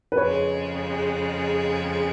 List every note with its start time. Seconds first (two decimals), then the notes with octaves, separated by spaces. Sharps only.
0.12 B4
0.17 F2 C#3 G#3 C#5